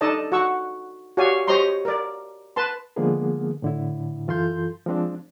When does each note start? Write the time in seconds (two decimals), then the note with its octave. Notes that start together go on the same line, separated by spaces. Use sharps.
0.01 D4 D#4 A4 D5 D#5 A5
0.32 F#4 F#5 C#6 E6
1.17 F#4 G4 C#5 D5 F5 G#5
1.48 G4 C5 C#5 D#5 A#5 C6
1.85 A#4 D5
2.56 B4 A5 C6
2.96 D3 F3 G#3 A#3 B3 G#4
3.62 A2 D3 E4
4.27 F#2 E3 F4 A4 C6 G6
4.86 F3 G#3 C4 D4